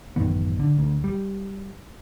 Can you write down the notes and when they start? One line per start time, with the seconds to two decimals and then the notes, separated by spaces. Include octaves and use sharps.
0.16 A1 F#2 D#3 B3
0.59 D3
0.79 D2
1.04 G3